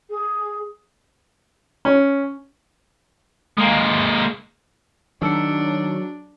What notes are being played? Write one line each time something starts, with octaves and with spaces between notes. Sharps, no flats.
G#4
C#4
G#3 A#3
D#3 F#3 D4 G#4 E6 C#7